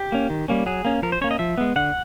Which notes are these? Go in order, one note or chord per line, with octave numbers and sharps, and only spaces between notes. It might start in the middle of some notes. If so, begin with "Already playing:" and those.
Already playing: G4
A#3 C#4
D#3
G3 A#3 C#4
F#3 G#4
A#3 C#4
F3 A#4
C5
A#3 C#4 C#5
D#5
F3 E5
G#3 B3
D3 F#5